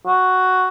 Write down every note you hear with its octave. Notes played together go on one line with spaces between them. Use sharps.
F#4